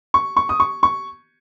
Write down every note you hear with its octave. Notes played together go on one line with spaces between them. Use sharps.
C#6
C#6
D#6
C#6
C#6